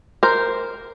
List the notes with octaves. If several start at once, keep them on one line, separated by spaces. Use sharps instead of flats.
A#4 C5